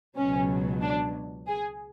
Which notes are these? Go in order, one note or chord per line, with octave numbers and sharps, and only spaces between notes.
C#2 B2 F#3 C#4
D4
G#4